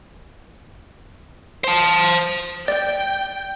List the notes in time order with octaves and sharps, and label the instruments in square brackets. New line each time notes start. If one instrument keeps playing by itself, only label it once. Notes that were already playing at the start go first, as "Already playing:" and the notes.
[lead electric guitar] C5 A5
[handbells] D5 [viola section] G5